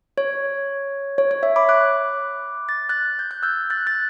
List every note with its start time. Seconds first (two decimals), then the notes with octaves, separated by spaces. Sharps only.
0.18 C#5
1.18 C#5
1.31 C#5
1.43 C#5 E5
1.56 B5 D6
1.69 D6 F#6
2.69 A6
2.89 F#6 A6
3.19 G6
3.31 F#6
3.43 E6 G6
3.70 F#6 A6
3.87 F#6 A6